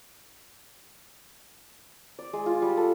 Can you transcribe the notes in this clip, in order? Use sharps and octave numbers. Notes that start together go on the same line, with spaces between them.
D5
G#3
F4
G3
A4